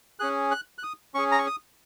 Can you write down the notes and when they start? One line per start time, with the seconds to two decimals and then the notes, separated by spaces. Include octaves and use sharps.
0.19 C#4 G#4 F#6
0.51 F#6
0.78 F#6
0.83 D#6
1.14 C#4 G#4 C#6
1.32 A#5
1.39 C#6
1.46 D#6